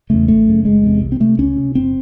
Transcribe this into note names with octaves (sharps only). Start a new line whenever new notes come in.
E2 C#3 A3
G#1 A3
F#2 C#3
F#1 G#3
E2 C3
C2
C4
C3 A3
C#2 C#4
C3
F#1 C4